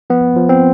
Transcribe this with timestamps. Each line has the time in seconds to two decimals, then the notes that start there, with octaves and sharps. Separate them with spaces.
0.10 F3 B3
0.36 F3
0.49 C4